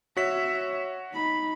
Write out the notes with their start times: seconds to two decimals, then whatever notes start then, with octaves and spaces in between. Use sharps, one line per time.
0.17 F#4 C#5 E5 B6
1.13 D#4 B5